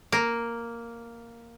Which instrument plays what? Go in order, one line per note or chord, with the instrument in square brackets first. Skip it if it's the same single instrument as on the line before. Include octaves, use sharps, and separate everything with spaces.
[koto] A#3